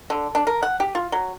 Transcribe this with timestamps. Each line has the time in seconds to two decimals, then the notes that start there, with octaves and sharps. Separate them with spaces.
0.10 D3
0.35 D4
0.47 A#4
0.63 F#5
0.80 G4
0.95 F4
1.12 F#3